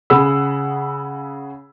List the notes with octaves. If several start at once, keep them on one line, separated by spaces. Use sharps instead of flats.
C#3 G#4 F#5 B5 E6